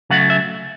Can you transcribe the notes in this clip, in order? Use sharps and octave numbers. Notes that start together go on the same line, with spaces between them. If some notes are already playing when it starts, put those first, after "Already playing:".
C#3 F#3 A3 F#5
E5